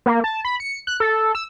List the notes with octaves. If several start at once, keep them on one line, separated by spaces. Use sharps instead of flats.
A#3
A5
B5
C#7
F#6
A4
E6